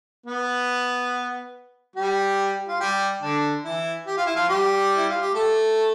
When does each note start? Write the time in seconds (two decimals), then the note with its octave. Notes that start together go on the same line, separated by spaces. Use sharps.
0.26 B3 B4
1.96 G3 G4
2.68 F4
2.80 G3 G4
3.22 D3 D4
3.64 E3 E4
4.07 G4
4.17 F4
4.26 E4
4.36 F3 F4
4.49 G3 G4
4.96 E4
5.09 F4
5.21 G4
5.34 A3 A4